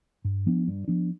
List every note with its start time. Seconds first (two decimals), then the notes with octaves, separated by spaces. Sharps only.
0.25 G2
0.46 F3 B3 D4
0.68 G2
0.88 F3 B3 D4